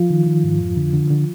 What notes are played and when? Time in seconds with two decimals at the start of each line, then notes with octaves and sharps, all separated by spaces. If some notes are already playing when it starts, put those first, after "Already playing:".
Already playing: F3 F4
0.10 D#3
0.26 D#3
0.44 G#2
0.60 F2
0.77 D3
0.93 D3
1.10 D3